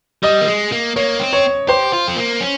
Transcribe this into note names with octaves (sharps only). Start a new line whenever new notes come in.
G3 D#5
A#3
G#3
A#3
A#3 C#5
C4
C#5
G4 C5
F4
C4
A#3
C#4